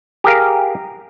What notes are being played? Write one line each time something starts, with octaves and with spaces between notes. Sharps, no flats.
G4 G#4 A#4 F5